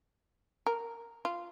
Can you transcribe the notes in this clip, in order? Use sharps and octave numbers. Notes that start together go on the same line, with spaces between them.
A#4
F4